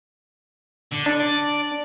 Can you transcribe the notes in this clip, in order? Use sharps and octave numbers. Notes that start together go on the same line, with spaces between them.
D3
D4
D5